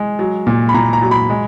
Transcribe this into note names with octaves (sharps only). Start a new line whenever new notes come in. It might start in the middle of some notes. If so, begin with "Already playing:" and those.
Already playing: G#3
F#3
A#2
B5
A#2 A#5
A#5
F#3
B5
G#3